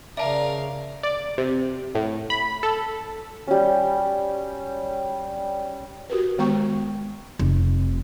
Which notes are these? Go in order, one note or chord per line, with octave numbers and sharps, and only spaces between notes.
C#3 A#4 D5 E5 F5 A5
D5
C3
A2
B5
A4
G3 C#4
F#4 G4 A#4 B4
D#3 G#3 B3 G5 A#5 C#6
F1